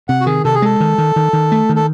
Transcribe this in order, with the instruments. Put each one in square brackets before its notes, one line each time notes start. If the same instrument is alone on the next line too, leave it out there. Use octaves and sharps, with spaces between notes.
[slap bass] C3 [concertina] F#5
[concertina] F#4
[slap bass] D#3 [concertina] G#4
[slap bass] C3 [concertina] A4
[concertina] G#4
[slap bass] G#3 [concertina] A4
[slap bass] D#3
D#3
D#3
D#3
A3
D#3
[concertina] A4